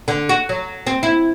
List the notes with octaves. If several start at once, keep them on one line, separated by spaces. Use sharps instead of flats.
D3
F#4
F#3
C4
E4